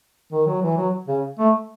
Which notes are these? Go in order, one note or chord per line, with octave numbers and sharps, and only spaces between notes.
D#3
F#3
E3
F#3
C#3
A3